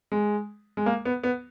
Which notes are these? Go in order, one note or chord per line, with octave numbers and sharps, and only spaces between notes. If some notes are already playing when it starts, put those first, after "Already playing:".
G#3
G#3
A#3
B3
B3